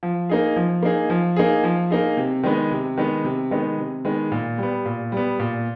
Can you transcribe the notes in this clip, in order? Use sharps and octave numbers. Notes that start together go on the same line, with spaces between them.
F3
A#3 D#4 G#4
F3
A#3 D#4 G#4
F3
A#3 D#4 G#4
F3
A#3 D#4 G#4
C3
D#3 G#3 B3 D#4
C3
D#3 G#3 B3 D#4
C3
D#3 G#3 B3 D#4
C3
D#3 G#3 B3 D#4
A#2
G3 B3
A#2
G3 B3
A#2